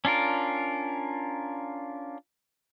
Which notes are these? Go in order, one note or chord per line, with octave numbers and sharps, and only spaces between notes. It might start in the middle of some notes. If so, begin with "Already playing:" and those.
C#4 D4 F4 A#4